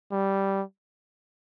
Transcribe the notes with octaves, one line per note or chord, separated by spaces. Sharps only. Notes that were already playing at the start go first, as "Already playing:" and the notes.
G3